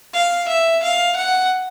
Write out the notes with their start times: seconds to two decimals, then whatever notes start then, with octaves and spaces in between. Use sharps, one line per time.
0.14 F5
0.48 E5
0.83 F5
1.16 F#5